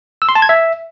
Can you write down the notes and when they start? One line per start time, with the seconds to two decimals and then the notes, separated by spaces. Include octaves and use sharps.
0.22 E6
0.29 C6
0.35 A5
0.42 G#6
0.49 E5